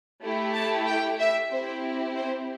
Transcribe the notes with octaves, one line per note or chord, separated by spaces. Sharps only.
A3 E4 G4
A5
G5
E5
C4 E4 G4 C5
C5